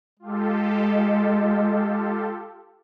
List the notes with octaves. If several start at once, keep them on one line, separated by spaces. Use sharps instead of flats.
G#3 F4 G4 A4